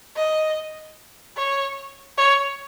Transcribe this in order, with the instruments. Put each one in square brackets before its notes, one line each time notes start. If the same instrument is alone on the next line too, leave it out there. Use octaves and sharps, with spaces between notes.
[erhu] D#5
C#5
C#5